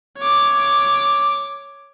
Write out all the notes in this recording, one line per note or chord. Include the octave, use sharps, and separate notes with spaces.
C#5 D6